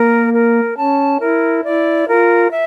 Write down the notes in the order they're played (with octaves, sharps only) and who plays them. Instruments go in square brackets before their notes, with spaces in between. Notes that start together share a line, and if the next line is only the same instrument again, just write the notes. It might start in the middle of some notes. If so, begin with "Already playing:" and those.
Already playing: [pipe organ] A#3 [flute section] A#4
[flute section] A#4
[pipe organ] C#4 [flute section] A5
[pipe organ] E4 [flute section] A#4
[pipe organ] E4 [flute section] D5
[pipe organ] F4 [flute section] A#4
[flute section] E5